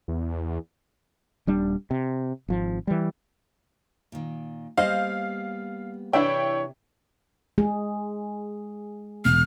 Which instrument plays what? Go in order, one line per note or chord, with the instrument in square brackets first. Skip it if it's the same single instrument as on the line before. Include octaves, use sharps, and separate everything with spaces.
[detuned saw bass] E2
[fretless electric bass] D#1 G3 D4
C3
G#1 F3
E3 G3
[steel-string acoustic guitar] A#2 D#3
[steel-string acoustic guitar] G3 A#3 B3 [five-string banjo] G#4 C5 D#5 [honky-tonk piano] F5
[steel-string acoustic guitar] C3 [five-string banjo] E3 D4 E5 [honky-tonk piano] E4 G5 [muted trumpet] C#5
[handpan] G#3 G#4
[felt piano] E1 [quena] F6